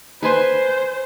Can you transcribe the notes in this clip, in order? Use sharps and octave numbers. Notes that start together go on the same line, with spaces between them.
B4 C5 G#5 C6